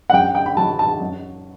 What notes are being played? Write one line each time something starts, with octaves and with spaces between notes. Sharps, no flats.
F#5
F#2 G5
G5
B5
F#3 A5
A5
F#2